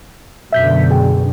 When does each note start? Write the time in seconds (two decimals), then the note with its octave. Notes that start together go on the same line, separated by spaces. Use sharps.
0.52 F#2 B2 D3 E5 G6 B6
0.91 G#4 G5